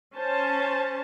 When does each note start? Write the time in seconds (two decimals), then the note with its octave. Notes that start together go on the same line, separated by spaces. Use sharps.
0.15 C#4 C5 A5